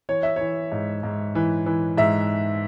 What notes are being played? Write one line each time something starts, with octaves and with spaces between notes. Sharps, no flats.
E3 C#5
E5
E3 C#5
G#2
G#2
E3
E3
G#2 E5